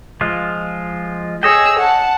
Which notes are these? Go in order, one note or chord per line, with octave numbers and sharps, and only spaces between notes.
F3 G#3 F4
G#4 C#5 D#5 G5 E6
F#5 A5